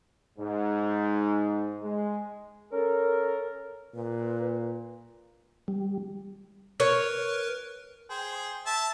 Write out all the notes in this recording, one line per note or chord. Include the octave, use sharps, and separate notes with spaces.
G#2
G#3
C#4 A4 A#4
A#2 B4
G3
A#4 B4 C#5
G#4 C5 G5
E5 A5